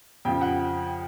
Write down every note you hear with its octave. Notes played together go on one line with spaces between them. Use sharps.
F2 C#3 F3 G5
F#5